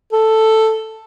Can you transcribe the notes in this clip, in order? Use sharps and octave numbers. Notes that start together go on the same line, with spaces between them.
A4